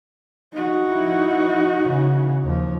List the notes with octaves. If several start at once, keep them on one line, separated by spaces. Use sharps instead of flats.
D#4 F#4
F3 E4
C#3 E3
D#2 F3